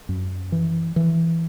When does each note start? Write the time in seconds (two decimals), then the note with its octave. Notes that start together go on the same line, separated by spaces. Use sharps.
0.09 F#2
0.52 E3
0.96 E3